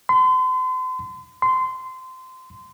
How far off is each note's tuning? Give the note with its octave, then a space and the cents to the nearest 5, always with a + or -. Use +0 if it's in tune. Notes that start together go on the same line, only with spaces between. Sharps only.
C6 -40
C6 -20